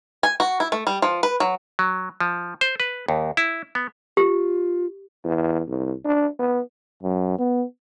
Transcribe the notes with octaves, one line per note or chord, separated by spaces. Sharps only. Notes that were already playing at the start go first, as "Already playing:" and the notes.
G#5
F#4
E4
A3
G3
F3
B4
F#3
F#3
F3
C5
B4
D#2
E4
B3
F4 G4
E2
C2
D4
B3
F#2
B3